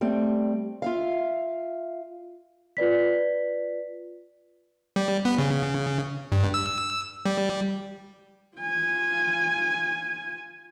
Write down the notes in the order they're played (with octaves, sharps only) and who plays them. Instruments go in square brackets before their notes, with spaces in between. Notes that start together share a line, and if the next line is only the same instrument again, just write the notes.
[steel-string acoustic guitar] G3 A3 C4
F4 E5 F5
[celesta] F4 B4 D5 B6
[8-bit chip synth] G3
B3
C#3
G2
E6
G3
[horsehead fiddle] F4 G#5